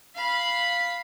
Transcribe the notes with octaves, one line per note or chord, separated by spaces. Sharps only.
F5 B5